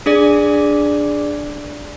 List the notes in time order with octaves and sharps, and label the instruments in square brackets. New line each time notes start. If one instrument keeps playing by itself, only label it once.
[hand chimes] D4 G#4 D5